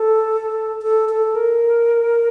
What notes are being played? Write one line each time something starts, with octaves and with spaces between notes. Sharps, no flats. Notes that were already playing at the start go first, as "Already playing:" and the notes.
Already playing: A4
A4
A4
A#4